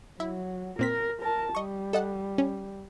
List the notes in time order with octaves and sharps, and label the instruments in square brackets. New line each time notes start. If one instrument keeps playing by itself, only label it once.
[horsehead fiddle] F#3 [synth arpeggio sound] E4
[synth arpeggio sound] A#2 C4 B6 [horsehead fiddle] A#4
[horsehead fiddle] A#4 A5
[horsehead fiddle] G3 [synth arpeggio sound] D#5 C#6
[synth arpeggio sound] A4 D#5 F#5
C#4